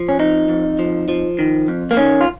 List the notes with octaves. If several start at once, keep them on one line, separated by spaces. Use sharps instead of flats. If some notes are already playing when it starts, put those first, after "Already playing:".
Already playing: F3
C#4
F2 D#4
F2
F3
F3
D#3
F2
A#3
D#3 C#4
F4